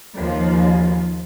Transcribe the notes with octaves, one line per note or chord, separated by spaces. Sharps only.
D#2 F3 F4